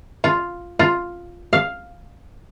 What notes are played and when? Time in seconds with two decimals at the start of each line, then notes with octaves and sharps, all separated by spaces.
0.24 F4
0.79 F4
1.53 F5